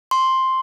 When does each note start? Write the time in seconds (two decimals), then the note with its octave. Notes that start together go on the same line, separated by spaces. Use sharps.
0.11 C6